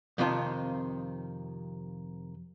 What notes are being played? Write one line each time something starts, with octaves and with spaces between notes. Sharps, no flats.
F2 C3 D#3 F4 A5